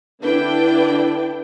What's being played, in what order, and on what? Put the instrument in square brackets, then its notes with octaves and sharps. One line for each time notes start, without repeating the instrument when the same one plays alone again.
[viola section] D3 D4 E4 B4 G5